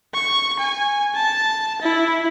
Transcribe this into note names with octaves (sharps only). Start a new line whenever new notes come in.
C#6
G#5
A5
E4